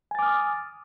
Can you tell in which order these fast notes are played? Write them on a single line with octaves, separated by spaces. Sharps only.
G#5 A6 D6 F6 D#6